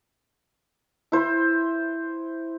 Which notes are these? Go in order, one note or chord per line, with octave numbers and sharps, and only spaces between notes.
E4 C5